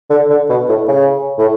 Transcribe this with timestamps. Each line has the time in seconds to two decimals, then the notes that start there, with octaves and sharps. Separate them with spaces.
0.10 D3
0.30 D3
0.50 B2
0.69 A2
0.88 C#3
1.39 A2